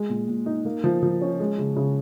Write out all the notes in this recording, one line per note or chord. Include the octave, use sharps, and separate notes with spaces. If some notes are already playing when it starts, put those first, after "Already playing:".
Already playing: G#3
A#2
A#2
D#4
A#3
F3
F3
C#4
G#3
C#3
C#3